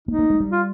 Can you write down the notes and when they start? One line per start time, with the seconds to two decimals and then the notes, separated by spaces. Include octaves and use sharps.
0.08 A#3 D#4
0.19 A#3
0.30 G#3
0.40 G3
0.52 F4